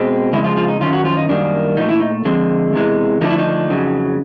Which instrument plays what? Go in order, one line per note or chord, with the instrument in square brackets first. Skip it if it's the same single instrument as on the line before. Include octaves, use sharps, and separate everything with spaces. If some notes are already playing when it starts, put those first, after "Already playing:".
Already playing: [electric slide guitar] B2 G#3 C4
F2 C#3 G#3 E4
F3 F4
F3 F4
D#4
F#2 D#3 C#4 F4
F#3 F#4
F3 F4
D#4
F#2 D#3 G3 A#3 D4
A#2 F3 A3 D#4
E3 E4
D#4
D3 F3 G#3 C4
E2 C3 E3 G#3
D3 F3 A3 D4 D#4
E4
D#4
F2 C#3 F#3